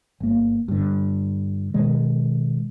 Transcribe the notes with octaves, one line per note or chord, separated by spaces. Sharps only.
G1 A#3
G2 D3
B2 D#3 G#3